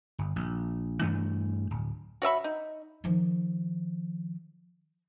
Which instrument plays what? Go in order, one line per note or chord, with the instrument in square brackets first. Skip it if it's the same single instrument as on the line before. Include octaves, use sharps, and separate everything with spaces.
[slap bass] G1
A#1
G2 E3 A3 D4
D1
[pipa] F#4 C#5 E5 B5
D#4
[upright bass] D#3 F3